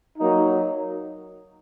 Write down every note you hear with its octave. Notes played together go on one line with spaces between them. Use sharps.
F#3 A#3 D#4